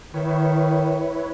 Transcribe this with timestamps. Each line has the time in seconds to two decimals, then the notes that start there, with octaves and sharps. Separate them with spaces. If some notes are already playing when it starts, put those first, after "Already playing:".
0.14 D#3 E4 B4 C#5